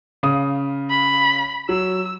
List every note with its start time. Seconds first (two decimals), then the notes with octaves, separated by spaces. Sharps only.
0.23 C#3 F5 D#6
0.90 B5
1.69 F#3 E6